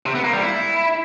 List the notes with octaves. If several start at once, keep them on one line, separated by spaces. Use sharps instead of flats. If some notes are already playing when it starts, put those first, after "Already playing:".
C3
B3
A#3
G3
E4